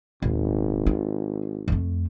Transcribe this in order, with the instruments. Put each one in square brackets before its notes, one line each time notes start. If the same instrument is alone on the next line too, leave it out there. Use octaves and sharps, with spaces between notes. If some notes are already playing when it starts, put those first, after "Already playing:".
[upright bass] D#1 [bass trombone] G#1
[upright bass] F4
F2 A3